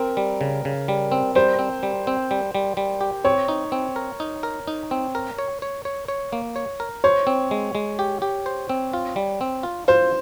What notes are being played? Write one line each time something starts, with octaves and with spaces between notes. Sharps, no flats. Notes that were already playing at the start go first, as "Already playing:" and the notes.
Already playing: C4 A#4
G3
C#3
C#3
G3
C4
G3 C5
C4
G3
C4
G3
G3
G3
G4
C4 C#5
D#4
C4
A#4
D#4
A#4
D#4
C4
A#4
C#5
C#5
C#5
C#5
A#3
C#5
A#4
C5 C#5
C4
G#3
G#3
G4
G4
C5
C4
F4
G3
C4
F4
F4 C5